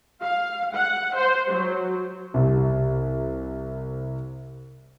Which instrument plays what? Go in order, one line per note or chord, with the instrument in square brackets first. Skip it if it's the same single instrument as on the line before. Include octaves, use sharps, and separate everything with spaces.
[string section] F5
F#5
C5
F#3
[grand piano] C2 C3